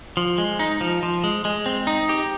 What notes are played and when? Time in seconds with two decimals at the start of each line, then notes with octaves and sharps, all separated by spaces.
0.17 F3
0.38 G#3
0.59 D#4
0.81 F3
1.03 F3
1.24 G#3
1.45 G#3
1.66 C4
1.87 D#4
2.09 G4